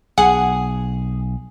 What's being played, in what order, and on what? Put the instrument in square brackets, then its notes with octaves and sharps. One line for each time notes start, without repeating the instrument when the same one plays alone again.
[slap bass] B1 [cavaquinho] G#4 [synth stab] F#5